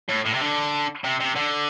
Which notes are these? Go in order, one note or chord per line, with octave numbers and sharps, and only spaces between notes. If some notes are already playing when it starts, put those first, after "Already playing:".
A2
A2
C3
D3
C3
C3
D3